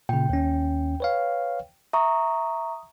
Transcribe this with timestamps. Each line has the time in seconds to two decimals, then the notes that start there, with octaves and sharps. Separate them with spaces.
0.09 A#2 C#3 G5
0.29 D#2 C#4
1.00 B4 C#5 F5
1.93 E5 A#5 C#6 D#6